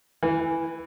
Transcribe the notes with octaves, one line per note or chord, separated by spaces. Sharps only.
E3